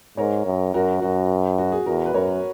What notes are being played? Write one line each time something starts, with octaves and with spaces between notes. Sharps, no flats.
G#2 A#4 C#5
F#2
F#2 F#4 A#4
F#2 F#4
F#4
G#4
E2 F#4 A#4
B4
F#2 A#4 C#5